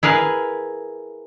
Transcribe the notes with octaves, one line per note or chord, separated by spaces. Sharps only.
E4 G#4 A#4 B4 F5